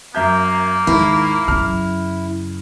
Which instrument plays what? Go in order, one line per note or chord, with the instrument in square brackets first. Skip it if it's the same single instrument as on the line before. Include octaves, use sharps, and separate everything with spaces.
[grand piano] F#2 E5 G6 [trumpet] A#3
[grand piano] D#2 G#2 [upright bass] D#3 [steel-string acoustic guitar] E4
[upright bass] F#2 C#3 [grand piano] F6